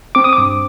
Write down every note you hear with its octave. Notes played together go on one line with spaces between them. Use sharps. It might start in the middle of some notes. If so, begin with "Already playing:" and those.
C4 D6
D#6
D6
G2